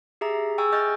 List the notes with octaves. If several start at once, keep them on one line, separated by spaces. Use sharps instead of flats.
G4 G#4 E5 A#5
G#4 G5 G#5 C#6 E6
D#5 C#6 F6 G6 A6